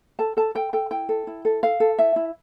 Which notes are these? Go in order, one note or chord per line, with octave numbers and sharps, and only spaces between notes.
A4 A5
A4 A5
A4 G5
A4 G5
E4 G5
A4
E4
A4
A4 F5
A4
E4 E5
E4